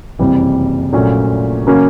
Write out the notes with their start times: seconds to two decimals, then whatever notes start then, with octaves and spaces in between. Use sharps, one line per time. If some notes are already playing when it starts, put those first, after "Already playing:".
0.19 F#1 F2 C3 E3 G3
0.93 A#1 A#2 F#3 A3 C#4
1.67 C#3 F#3 A#3 C#4